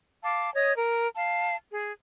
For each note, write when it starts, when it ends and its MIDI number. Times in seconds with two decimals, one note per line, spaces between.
0.23 0.50 77
0.23 0.50 81
0.23 0.50 86
0.54 0.72 73
0.54 0.72 75
0.54 0.72 87
0.76 1.07 70
1.16 1.55 77
1.16 1.55 81
1.70 1.91 68